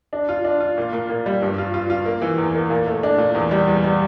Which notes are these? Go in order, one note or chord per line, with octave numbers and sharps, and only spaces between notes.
D4
F4
D4
F4
A#2
A#2
A#2
G3
G2
F4
F4
F4
A#3
E3
E2
A#3
A#2
A3
D4
A#2
E2
G3
E2
G3